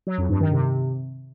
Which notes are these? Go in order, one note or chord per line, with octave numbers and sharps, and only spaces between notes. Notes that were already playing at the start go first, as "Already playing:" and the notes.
F#3
F2
G2
D#3
C3